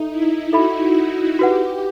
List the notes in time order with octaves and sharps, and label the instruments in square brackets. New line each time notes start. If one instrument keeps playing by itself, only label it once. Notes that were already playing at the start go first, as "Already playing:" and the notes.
Already playing: [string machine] D#4 [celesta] A4 E5
[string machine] E4
[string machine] F#4 [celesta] A4 E5 B5
[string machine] F#4
[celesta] F#4 B4 F#5 [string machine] G4